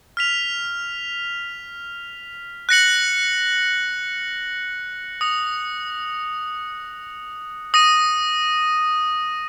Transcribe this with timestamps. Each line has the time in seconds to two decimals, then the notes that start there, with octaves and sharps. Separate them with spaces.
0.17 F6 B6 F7
2.69 F#6 A#6 C#7 F#7
5.21 D#6 A#6 C#7 F7
7.74 D#6 A#6 D#7